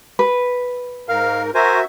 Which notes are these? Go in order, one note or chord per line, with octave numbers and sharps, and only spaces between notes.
B4
G#2 A#4 F5
F#4 A#4 C5 E5 G#5